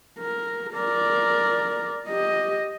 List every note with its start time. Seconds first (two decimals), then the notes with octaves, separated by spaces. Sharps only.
0.19 A#4
0.73 A#4 D5
2.08 G4 D#5